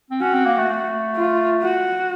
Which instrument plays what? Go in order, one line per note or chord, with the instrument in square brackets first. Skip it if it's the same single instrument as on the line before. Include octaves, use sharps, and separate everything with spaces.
[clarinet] C4
[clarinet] C#4 [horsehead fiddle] F#4
[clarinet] C4
A#3
A3
A3
[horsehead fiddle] F4
F#4